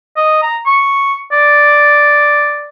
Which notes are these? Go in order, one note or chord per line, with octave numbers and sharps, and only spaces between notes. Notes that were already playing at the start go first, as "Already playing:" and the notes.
D#5
A#5
C#6
D5